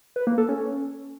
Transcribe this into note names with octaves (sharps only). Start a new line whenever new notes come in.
B4
A#3
A4
C#4